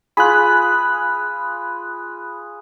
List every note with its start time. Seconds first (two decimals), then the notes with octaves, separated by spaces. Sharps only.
0.17 F4 G#4 B5 F#6